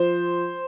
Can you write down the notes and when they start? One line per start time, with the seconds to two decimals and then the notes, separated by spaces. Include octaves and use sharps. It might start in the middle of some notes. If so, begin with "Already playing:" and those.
Already playing: F3 C5